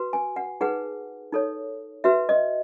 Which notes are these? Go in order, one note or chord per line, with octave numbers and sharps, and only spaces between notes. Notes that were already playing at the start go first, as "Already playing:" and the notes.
Already playing: F#4 B4
G#5
F#5
D#4 G#4 B4 F#5
D#4 A4 C#5
F#4 B4 E5
D#5